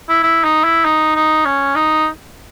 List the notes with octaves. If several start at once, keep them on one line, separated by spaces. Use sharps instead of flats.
E4
E4
D#4
E4
D#4
D#4
C#4
D#4